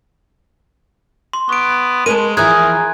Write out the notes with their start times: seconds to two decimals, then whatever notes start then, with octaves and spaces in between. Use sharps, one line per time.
1.33 C6
1.49 B3 C#6 D7
2.06 G#3 A#4 B4 A5 D#7
2.37 E3 F3 E4 G#4 A#4 F#6 G#6